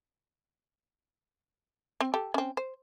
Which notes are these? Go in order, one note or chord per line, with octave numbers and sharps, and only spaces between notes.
C4
G4 A4
C4 C#4
C5